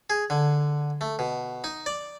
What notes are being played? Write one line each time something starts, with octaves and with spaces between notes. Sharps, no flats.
G#4
D3
A3
B2
D#4
D5